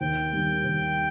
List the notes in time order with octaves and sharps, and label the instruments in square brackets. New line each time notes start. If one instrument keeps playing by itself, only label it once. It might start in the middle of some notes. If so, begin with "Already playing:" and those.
[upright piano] D#2 [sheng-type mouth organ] G5
[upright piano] D#3 G3
D#2